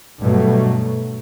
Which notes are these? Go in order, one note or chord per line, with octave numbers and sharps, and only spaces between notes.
G2 B2 F#3 A3